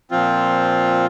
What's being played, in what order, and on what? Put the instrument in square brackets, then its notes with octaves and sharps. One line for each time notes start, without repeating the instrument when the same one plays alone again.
[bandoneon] A#2 F3 C4 F4